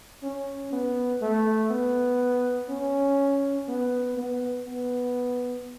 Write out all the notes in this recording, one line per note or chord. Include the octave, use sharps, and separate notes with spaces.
C#4
B3
A3
B3
C#4
B3
B3
B3